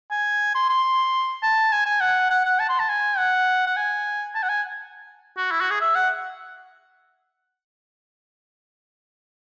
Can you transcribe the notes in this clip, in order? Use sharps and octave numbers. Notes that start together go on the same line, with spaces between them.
G#5
C6
C6
A5
G#5
G#5
F#5
F#5
F#5
A5
C6
A5
G#5
F#5
F#5
G#5
A5
F#5
G#5
F#4
E4
F#4
G#4
E5
F#5